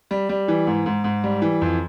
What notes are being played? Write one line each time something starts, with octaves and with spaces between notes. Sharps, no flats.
G3
G3
E3
G#2
G#2
G#2
G3
E3
F2